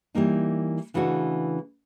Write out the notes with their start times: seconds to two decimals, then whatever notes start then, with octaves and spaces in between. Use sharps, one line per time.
0.15 E3 G3 A#3 D#4
0.94 C#3 E3 A3 D4 F#4